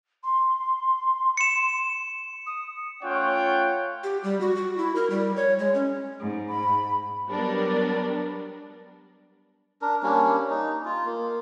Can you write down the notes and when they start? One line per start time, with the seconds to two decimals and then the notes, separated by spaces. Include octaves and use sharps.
0.23 C6
1.37 C#7 E7
2.46 D#6
3.02 A3 C#4 F4 C#5 F#5 G5
4.04 G4
4.24 G3
4.41 F#4
4.56 F#4
4.78 E4
4.96 A#4
5.10 G3
5.36 C#5
5.59 G#3
5.75 C#4
6.20 G#2
6.49 B5
7.28 F#3 G3 B3 D4 A#4
9.82 D4 A#4
10.03 G3 A#3 C#4 D4
10.50 D#4
10.85 F4
11.06 A#3